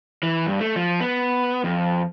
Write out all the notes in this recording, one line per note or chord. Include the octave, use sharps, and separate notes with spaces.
E3
G2
A3
F3
B3
F2